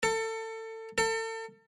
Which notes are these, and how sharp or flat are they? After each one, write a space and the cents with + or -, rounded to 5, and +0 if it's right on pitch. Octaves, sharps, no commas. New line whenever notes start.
A4 +25
A4 +35